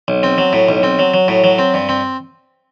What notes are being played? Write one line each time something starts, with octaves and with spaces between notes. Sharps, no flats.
B1
C4
F#3
A2
B1
C4
F#3
F#3
A2
F#3
C4
G2
C4